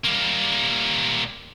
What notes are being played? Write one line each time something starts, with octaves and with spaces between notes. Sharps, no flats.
G3 A#3